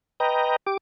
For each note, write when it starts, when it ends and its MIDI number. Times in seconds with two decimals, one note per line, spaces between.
0.20 0.56 71
0.20 0.56 75
0.20 0.56 79
0.20 0.56 82
0.67 0.77 67
0.67 0.77 86